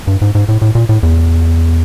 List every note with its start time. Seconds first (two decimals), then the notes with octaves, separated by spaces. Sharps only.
0.07 G2
0.22 G#2
0.35 G#2
0.48 A2
0.62 A2
0.75 A#2
0.89 A2
1.03 E2